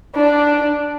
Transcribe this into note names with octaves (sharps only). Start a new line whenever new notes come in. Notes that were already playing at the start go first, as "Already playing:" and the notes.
D4